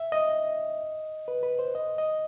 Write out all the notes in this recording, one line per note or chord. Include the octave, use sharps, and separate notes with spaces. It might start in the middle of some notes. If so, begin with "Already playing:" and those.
Already playing: E5
D#5
B4
B4
C5
D#5
D#5